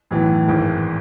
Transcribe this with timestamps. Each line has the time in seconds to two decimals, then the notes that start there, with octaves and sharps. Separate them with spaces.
0.11 B1 A2 E3 B3
0.47 G#1 G#2 E3